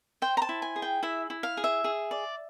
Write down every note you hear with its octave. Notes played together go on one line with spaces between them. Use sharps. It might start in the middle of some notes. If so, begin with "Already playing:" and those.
C5 G5
A#5
A5
E4
G#5
G#4
G5
E4 E5
E4
F5
G#4
E5
G#4
D5